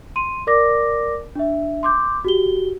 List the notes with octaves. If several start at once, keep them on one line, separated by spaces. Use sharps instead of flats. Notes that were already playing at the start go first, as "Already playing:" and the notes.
C6 D#7
A#4 D5 D6 A#6
D4 E5
C6 D6 G6
F#4 G4 G7